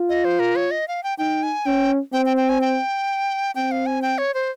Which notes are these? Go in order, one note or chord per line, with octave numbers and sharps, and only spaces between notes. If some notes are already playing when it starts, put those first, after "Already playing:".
Already playing: F4
D#5
C5
A#4
C#5
D#5
F5
G5
D#4 G5
G#5
C#4 G5
C4 G5
G5
G5
G#5
G5
C4 G5
F5
G#5
G5
C#5
C5